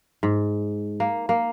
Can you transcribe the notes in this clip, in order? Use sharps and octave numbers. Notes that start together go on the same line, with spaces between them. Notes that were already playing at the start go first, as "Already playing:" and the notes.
G#2
A#3
A#3